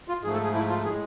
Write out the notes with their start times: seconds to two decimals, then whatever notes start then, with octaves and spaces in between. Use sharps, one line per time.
0.08 F4
0.23 G#2 F3 A3 G#4
0.33 A4
0.44 G#4
0.55 E4
0.69 F4
0.84 A2 G#3 G#4